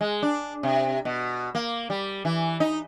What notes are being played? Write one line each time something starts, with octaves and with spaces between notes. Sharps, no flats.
G#3
D4
C3
B2
A#3
G3
E3
D#4